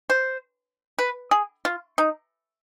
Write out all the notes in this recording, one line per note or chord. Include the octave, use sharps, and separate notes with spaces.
C5
B4
G#4
F4
D#4